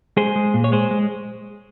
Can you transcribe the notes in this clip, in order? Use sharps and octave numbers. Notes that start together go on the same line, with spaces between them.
G#3 G#4 C5
G#3
A#2
C#5
G#3 G#4 C5
G#3